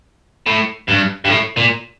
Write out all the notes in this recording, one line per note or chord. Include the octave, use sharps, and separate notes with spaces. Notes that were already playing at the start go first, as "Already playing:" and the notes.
A2
G2
G2
A2
A#2